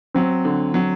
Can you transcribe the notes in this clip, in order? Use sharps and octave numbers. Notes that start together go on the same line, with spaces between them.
F#3 C4
D3
F#3